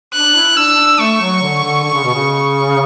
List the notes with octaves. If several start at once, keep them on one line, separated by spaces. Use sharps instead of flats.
D4 F#6
E4
D4 E6
D4
A3 C#6
F#3
D3
D3
D3
C#3
B2
C#3